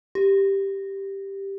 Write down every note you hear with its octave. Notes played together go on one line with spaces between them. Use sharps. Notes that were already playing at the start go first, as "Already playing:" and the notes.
G4